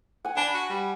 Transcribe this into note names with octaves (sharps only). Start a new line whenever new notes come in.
F#5 G#5
D4 G#5 B5
F#4
G3